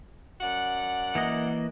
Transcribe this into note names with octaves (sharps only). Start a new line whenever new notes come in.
F#2 D5 F#5
E3 A#3 D#5